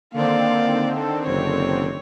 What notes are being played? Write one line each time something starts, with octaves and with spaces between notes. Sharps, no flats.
D3 D#3 A#3 C4 D5 F5
A4
F#1 C#5